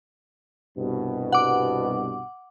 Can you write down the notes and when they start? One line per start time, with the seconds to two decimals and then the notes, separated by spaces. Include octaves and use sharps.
0.78 C2 G2 B2
1.32 F#5 D6